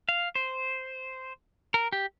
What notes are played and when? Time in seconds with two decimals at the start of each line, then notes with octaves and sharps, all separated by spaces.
0.09 F5
0.35 C5
1.74 A#4
1.92 G4